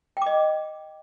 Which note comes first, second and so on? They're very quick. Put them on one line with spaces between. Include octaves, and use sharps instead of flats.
G5 D6 D#5